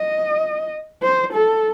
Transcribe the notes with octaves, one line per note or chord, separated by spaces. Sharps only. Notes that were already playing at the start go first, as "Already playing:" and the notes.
Already playing: D#5
C5
A4